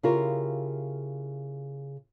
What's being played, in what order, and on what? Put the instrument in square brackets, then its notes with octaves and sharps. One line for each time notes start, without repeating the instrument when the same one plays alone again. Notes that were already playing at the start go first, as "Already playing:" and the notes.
[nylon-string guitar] C#3 E4 F4 G4 A#4